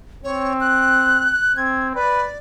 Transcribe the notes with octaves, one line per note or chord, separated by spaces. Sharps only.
C4 C#5
F#6
C4 G#6
B4 D5